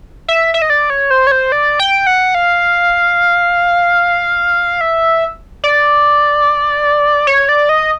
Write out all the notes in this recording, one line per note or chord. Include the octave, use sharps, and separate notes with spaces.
E5
E5
D#5
D5
C#5
C5
C#5
C5
D5
G5
F#5
F5
E5
D5
C#5
D5
D#5